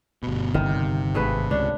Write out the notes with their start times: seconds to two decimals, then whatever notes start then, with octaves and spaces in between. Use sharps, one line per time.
0.23 G1 B2
0.54 G1 C3 D#3
1.15 G#1 G2 A3 G#4 B4
1.51 C#2 D4 C#5